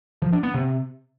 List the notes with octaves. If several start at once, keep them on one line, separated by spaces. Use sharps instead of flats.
F3
D4
B3
C3